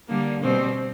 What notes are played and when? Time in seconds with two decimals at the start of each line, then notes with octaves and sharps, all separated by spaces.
0.09 D3 G3 A#3
0.41 B2 G3 C4